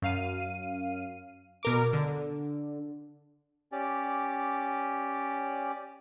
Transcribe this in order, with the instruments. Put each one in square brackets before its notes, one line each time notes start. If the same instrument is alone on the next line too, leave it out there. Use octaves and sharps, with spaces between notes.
[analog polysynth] F#2 F5 D#7
B2 A#4 D6
D3
[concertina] C#4 G4 D5